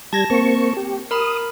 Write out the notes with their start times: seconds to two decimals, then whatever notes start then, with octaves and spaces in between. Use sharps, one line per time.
0.13 G3 A5 G#6 A#6
0.30 A#3 C4 C#6
0.77 G4
1.11 A#4 B5 D#6